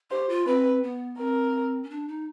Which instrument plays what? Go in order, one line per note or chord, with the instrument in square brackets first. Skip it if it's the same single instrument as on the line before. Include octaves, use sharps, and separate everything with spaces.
[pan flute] G4 [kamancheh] C5
[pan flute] F4
[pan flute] C4 [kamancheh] B4
[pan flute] B3
[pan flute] C4 [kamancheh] A#4
[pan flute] C#4
D4
D#4